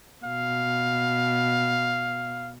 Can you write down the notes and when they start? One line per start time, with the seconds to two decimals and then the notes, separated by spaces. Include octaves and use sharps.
0.25 B2 F5